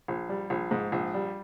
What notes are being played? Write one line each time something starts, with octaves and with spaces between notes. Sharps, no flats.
A#1
G3
A#1
G#2
A#1
G3